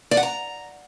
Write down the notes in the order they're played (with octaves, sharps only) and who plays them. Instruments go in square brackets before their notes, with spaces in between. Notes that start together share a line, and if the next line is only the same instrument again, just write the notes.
[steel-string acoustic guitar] D5
F#5
A#5